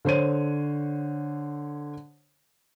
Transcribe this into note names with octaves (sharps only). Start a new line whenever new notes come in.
D3 C5 C#5 D#7